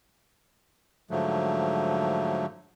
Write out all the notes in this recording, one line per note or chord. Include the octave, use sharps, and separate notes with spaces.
G#2 D3 F3 F#3 A3